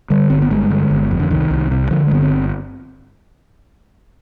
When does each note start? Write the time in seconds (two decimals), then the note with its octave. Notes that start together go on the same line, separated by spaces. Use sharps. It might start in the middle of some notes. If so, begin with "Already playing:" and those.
0.10 D3 G3
0.30 G1 C4
0.42 B3
0.51 G2 G#3
0.70 D3
0.91 G1
1.11 F2
1.20 D3
1.31 C2 D#3
1.51 C2
1.71 C3
1.91 D3 F3
2.07 G#3
2.11 G1 B3
2.22 C4